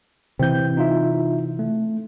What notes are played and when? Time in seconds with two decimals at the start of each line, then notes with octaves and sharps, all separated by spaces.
0.39 C3 E3 C4 G6
0.77 D#4 F4 E5
1.59 A3